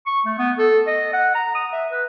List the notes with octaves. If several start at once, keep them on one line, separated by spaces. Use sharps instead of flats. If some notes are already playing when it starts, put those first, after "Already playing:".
C#6
A3
B3
A4
D#5
F#5
A#5
D#6
E5
B4